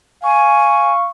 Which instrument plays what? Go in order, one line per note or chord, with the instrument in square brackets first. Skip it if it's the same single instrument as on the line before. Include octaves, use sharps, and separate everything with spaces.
[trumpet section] F5 C#6 [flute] G#5